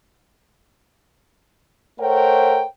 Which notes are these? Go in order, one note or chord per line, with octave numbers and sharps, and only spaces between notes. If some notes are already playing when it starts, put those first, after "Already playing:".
A3 A#4 C5 C#5 F#5 G5